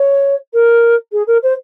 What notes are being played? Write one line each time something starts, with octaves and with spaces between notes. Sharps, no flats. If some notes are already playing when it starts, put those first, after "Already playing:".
Already playing: C#5
A#4
G#4
A#4
C5